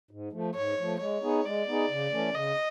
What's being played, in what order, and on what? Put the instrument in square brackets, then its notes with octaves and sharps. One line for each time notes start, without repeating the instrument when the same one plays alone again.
[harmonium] G#2
F3 A3
[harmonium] G#2 [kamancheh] C#5
[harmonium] F3 A3
[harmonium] G#3 [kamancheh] C#5
[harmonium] B3 D#4 G#4
[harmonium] G#3 [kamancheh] D5
[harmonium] B3 D#4 G#4
C#3
E3 A3 C#4
[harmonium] C#3 [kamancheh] D#5